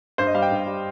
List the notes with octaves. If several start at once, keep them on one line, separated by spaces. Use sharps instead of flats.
G2 C5
D#5
G3 F5
G5
G2
G3